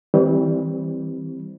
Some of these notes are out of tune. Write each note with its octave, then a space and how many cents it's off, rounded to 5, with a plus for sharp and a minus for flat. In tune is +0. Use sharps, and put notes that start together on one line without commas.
E3 -20 G3 +0 C4 +0